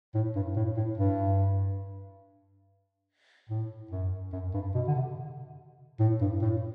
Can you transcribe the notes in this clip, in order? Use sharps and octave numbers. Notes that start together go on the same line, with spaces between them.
A2
G2
A2
A2
G2
A2
F#2
F#2
G2
B2
D3
C3
A2
G2
A2